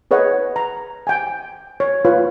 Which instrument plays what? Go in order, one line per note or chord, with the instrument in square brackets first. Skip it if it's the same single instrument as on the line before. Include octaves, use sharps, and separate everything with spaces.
[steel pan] G#4 B4 C#5 D#5 F#5
A#5
G5 G#5
C#5
F4 B4 C#5